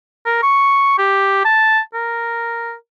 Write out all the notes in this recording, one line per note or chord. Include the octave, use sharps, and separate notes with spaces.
A#4
C#6
G4
A5
A#4